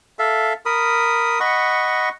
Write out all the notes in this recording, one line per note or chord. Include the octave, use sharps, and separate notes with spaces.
A4 E5 F5
A#4 B5 D#6
D#5 F#5 B5 C#6